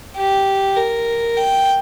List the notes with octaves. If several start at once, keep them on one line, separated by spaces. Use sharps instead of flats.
G4
A#4
G5